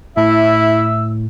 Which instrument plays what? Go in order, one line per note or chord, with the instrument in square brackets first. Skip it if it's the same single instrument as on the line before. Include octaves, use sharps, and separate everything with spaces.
[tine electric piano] A2 [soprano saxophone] E4 [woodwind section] E5 E6